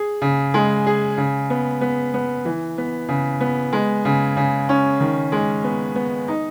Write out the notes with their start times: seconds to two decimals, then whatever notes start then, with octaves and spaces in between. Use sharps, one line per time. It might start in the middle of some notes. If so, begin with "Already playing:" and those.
Already playing: G#4
0.22 C#3
0.54 G#3
0.87 G#4
1.18 C#3
1.50 B3
1.81 B3
2.14 B3
2.45 E3
2.78 B3
3.09 C#3
3.41 B3
3.73 G#3
4.05 C#3
4.37 C#3
4.69 C#4
5.00 D#3
5.32 G#3
5.64 B3
5.95 B3
6.28 D#4